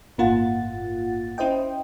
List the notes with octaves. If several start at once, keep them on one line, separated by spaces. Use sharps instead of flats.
G1 A2 A#3 F4 F#5 A6
C#4 E4 C5 D#5 G5